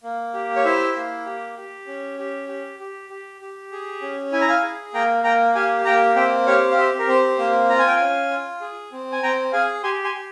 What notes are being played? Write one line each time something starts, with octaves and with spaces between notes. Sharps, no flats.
A#3
G4
C#5
E4 C5 E5
A#3
G4
G4
C#4
G4
G4
G4
G4
G4
G#4
C#4
E4 G#5
A#5
F5 G#5
G#4
A#3 G5 A#5
A#3 G5 A#5
G4 F5 G#5
A#3 G5 A#5
C4 E5 G5
G4 C#5 F5
F5
G4 C5 E5
A#4
C4 C5
A#3 C5
F4 A#5
G#5
G5
C#4 F5 G#5
F4
G#4
C4
G#5
C4 G5 A#5
G#4 F5 G#5
G4 G#5 C6
G#5 C6
G4